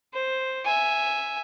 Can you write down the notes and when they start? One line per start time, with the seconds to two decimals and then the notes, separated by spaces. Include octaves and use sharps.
0.14 C5
0.64 E5 G#5